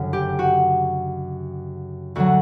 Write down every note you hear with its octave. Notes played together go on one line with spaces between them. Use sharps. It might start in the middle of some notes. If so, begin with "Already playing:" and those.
Already playing: G1 F#2 C#3
G4
F#4
D2 D3 F#3 F#4